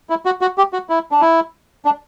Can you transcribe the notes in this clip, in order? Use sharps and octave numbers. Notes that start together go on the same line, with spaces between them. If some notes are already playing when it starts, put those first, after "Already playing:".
E4
F#4
F#4
G4
F#4
E4
D4
E4
D4